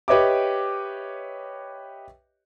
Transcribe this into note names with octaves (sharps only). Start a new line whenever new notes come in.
G4 B4 C#5 D#5 E5 D6